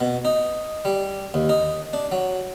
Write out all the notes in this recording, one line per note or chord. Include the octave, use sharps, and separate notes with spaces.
B2
D#4
G3
D#2
D#4
D4
F#3